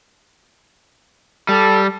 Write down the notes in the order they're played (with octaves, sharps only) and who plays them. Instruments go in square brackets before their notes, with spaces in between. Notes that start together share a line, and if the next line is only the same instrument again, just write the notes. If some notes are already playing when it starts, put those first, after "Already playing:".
[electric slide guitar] G3 [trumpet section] A4